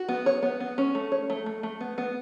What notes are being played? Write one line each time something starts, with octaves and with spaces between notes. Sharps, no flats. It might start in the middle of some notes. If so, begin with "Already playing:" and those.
Already playing: F#4
B3
C#5
B3
B3
C#4
A3
C#5
A3
A3
A3
B3
B3